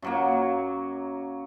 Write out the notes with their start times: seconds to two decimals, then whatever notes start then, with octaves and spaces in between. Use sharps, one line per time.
0.02 F#2 F#3 A#3